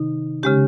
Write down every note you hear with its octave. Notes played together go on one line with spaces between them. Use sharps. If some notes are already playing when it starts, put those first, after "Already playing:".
Already playing: C3 D#3 D#4
C#3 G#3 C#4 G4